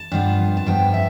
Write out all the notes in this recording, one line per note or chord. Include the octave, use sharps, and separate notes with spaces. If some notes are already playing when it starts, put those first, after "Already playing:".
Already playing: A5
G2 F3 B3
A5
G2 F3 B3 G5
E5